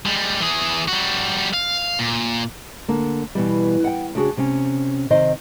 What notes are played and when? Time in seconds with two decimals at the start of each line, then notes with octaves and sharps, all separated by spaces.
0.06 G3 G#3
0.40 E3 G#4
0.88 G3 F#4
1.53 F5
1.99 A#2
2.88 D3 A#3
3.35 B2 E3 G3
3.84 F#5 G5
4.15 C#3 D4 F#4 G#4
4.37 C3 C#4
5.10 C3 D#3 D#4 C5 D#5